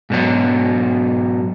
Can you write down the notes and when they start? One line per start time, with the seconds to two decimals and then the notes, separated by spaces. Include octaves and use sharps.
0.10 G#2 B2 F#3